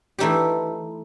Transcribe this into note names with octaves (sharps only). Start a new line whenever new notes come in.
E3 A3 D#4 G4